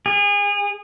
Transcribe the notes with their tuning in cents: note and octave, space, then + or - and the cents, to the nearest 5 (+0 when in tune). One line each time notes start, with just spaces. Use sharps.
G#4 -30